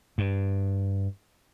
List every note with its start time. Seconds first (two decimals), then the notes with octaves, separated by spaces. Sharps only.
0.18 G2